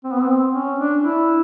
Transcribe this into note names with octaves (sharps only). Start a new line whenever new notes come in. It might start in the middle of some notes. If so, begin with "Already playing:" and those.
C4
B3
C4
C#4
D4
E4